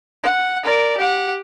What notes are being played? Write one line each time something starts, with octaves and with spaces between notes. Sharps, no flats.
F#5
A#4 D5
G4 F#5